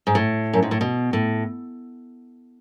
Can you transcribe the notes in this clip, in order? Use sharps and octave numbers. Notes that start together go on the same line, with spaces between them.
G#2
A2
F#2
G#2
A2
B2
A2